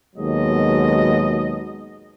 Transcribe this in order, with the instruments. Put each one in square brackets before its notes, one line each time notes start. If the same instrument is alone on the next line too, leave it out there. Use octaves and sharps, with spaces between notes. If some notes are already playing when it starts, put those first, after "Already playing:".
[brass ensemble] D#2 B2 F#3 G#3 D#5